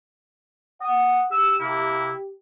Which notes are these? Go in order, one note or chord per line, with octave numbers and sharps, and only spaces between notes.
F#5 D#6
G4 E6
C3 A#3 E4